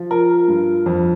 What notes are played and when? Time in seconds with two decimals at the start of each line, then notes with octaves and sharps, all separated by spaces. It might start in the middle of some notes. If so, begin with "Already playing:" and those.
Already playing: F3
0.11 F4 A#4
0.48 G2
0.86 F2